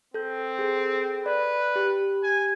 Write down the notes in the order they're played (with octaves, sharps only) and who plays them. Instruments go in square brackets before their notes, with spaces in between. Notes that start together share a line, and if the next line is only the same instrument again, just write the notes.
[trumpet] C4 [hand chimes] A4 G6
[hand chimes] G#4 A4
[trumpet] B4 [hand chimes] D5
[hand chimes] G4
[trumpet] G#5